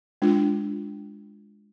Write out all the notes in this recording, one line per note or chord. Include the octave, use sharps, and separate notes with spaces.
G#3 D4 F4